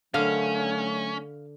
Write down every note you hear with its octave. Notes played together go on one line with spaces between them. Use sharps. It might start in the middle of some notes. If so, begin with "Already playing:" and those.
D3 D#3 F#3 A3 C#4 F5